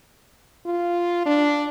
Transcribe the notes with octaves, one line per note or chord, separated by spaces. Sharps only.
F4
D4